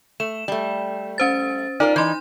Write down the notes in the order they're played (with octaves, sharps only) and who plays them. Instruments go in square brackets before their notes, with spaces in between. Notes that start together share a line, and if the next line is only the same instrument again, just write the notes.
[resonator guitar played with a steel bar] A3 [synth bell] E7
[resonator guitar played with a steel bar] G3 A3
[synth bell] C#4 C5 A6
[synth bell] D#4 [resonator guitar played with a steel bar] F4 A#4 D5
[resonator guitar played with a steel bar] E3 D#4 [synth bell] C6 G6